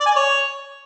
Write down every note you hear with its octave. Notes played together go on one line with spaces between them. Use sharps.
D5
G#5
D5
C#5